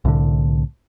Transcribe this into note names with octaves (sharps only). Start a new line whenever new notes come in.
C2 A2 D3